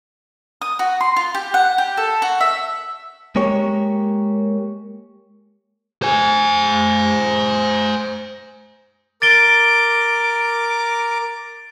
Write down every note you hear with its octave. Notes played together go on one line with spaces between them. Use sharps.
D#6
F#4
C6
F4
G4
F#5
G4
A4
F#4
E5
G#3 A#3 G4 C#5
C5 G#5
A#4 D6 A6 D7 G7